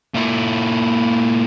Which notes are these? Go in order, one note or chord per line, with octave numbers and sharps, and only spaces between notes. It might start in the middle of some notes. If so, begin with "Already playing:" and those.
A#2 E4